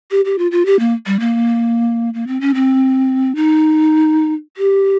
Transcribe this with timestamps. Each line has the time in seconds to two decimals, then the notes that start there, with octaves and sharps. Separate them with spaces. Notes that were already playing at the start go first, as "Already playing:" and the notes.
0.11 G4
0.25 G4
0.38 F4
0.51 F4
0.66 G4
0.79 A#3
1.06 G3
1.20 A#3
2.14 A#3
2.27 C4
2.41 C#4
2.54 C4
3.35 D#4
4.57 G4